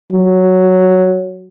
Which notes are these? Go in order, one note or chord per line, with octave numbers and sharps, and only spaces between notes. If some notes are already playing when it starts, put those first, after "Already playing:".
F#3